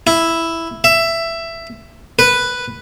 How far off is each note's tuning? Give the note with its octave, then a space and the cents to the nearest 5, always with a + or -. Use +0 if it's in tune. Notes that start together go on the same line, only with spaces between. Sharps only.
E4 +0
E5 +15
B4 +0